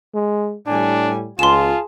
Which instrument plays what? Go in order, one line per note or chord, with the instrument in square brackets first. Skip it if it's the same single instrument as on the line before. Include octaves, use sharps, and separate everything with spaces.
[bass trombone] G#3
[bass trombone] A2 [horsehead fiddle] G3 G#5 [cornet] D4
[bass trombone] C#2 [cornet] F4 [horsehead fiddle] G#4 A5 [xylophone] C6 E7